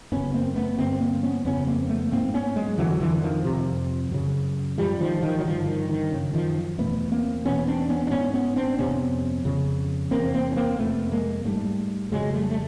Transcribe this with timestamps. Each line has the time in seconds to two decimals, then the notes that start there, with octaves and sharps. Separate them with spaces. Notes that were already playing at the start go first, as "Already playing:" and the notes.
0.12 F#2 C#3 B3 C#4
0.34 A#3 C4
0.56 A3 B3
0.78 G2 D3 A#3 C4
1.00 A#3 C4
1.23 B3 C#4
1.45 F2 C#3 B3 C#4
1.67 A#3 C4
1.89 A3 B3
2.12 G#2 A#3 C4
2.34 B3 C#4
2.56 F#3 G#3
2.78 F2 D3 E3 F#3
3.01 D3 E3
3.23 D#3 F3
3.45 F2 C3
4.11 F#2 C#3
4.78 G#2 F3 G3
5.01 D#3 F3
5.23 D#3 F3
5.39 F#3
5.45 G2 D3 D#3 F3
5.67 D#3
5.89 D#3
6.11 F#2 C#3
6.33 D#3 F3
6.78 E2 B2 A3 B3
7.12 A#3 C4
7.45 E2 B2 B3 C#4
7.67 C4 D4
7.89 B3 C#4
8.07 D4
8.11 G#2 B3 C#4
8.34 B3 C#4
8.56 C4 D4
8.78 F2 C3 B3 C#4
9.45 F2 C#3
10.11 E2 C3 A#3 C4
10.34 A#3 C4
10.51 C#4
10.56 A#3 C4
10.79 F2 C3 A3 B3
11.12 G#3 A#3
11.45 G#2 G3 A3
12.11 F2 C#3 F#3 G#3
12.33 G3 A3
12.50 A3